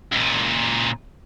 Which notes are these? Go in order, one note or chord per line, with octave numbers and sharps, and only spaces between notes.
C#2 A#2